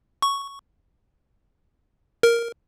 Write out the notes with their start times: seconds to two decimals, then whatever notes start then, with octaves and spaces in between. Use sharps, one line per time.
0.22 C#6
2.23 A#4